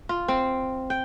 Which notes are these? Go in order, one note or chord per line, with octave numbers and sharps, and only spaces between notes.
F4
C4
G5